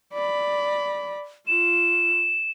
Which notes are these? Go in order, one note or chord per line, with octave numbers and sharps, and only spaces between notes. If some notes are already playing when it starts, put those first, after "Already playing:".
D5 B5
F4 E7